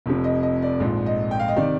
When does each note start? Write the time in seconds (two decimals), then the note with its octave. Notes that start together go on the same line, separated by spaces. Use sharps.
0.06 F1 F2 C3
0.24 D#5
0.43 D#5
0.62 D5
0.80 A#1 G#2 F3
1.06 D#5
1.31 G5
1.39 F5
1.48 D#5
1.56 C3 D#3 D5